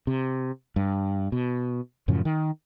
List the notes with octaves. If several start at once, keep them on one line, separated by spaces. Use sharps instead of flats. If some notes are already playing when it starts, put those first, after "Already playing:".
C3
G2
B2
F#2 A2 C#3 F3
D#3